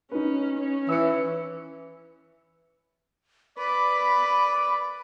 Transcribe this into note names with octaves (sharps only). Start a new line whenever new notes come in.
C#4 D#4 B4
C#4
E3 E6 C#7
B4 D5 B5